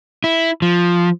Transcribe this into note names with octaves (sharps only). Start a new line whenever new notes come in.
E4
F3